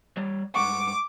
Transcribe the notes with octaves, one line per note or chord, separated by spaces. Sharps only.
G3 C#5 D5
G2 G#3 F#5 C#6 D6